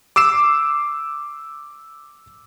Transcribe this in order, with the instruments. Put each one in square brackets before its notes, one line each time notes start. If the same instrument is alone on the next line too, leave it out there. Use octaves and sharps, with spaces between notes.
[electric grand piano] D6 E6 C7 E7